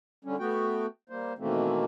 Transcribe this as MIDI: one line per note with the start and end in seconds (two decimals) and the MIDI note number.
0.25 0.36 50
0.25 0.36 55
0.25 0.36 61
0.39 0.86 57
0.39 0.86 59
0.39 0.86 66
0.39 0.86 79
1.10 1.33 55
1.10 1.33 58
1.10 1.33 72
1.39 1.85 47
1.39 1.85 51
1.39 1.85 52
1.39 1.85 57
1.39 1.85 58
1.39 1.85 60